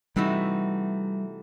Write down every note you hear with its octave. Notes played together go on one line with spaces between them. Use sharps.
C3 E3 G3 A3 D#4 F#4